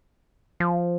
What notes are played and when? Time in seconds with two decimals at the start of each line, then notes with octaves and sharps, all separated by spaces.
0.60 F3